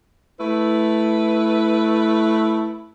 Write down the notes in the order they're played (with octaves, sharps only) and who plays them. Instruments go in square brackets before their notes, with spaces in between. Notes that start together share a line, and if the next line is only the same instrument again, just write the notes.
[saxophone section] A3 E4 B4